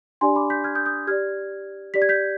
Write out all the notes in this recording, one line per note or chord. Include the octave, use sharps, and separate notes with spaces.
D4 G4 D5 G#5 C6
B5 D6
G6 B6
F6 G#6
D#6 G6
D#6 G6
G4 D5 F6 G#6
G4 D5 B6
G#6
G6 B6